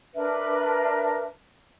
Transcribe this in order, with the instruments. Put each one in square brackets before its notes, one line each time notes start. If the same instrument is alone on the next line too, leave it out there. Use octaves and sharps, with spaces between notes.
[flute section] D4 A#4 B4 E5